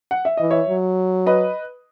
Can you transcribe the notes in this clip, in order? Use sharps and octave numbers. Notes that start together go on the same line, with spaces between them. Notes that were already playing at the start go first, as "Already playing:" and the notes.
F#5
E5
E3 D#5
C#5 E5
F#3
B4 D#5